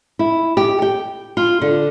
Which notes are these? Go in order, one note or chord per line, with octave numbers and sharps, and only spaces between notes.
E4
G4
G5
F4
D3